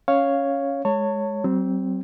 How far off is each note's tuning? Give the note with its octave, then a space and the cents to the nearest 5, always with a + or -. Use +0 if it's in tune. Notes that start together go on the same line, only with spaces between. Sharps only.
C#4 +0 C#5 +0 F5 +0
G#3 +0 C#5 +0 A5 +35
F#3 +45 C4 +0